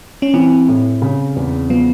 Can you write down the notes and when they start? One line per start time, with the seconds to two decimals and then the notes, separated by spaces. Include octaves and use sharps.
0.22 C#4
0.34 E3 C4
0.68 A2
1.02 C#3
1.36 E2
1.69 F3 B3